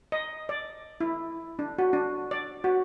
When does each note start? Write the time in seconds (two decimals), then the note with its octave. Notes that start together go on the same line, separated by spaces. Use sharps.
0.12 D#5
0.49 D5
1.01 E4
1.59 D4
1.79 F#4
1.93 D4
2.31 D5
2.64 F#4